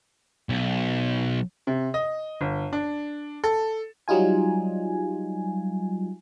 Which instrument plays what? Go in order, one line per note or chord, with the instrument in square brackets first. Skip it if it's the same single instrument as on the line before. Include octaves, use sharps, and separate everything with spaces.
[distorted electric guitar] B1
[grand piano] C3
D#5
G1
D4
A4
[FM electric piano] F#3 G3 D#4 F4 G#5